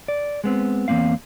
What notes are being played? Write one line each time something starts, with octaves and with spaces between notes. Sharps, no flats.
D5
G#3 B3 C4
E2 D3 A#3 C4 F5